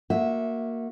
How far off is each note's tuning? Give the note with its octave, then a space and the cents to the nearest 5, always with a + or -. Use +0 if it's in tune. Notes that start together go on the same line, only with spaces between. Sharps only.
A#3 +0 F#4 -20 E5 -10